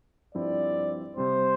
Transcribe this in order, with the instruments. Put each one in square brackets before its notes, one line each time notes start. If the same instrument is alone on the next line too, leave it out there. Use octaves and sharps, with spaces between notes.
[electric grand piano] G2 F3 C4 E4 [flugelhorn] D5
[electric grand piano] C3 G3 C4 [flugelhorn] C5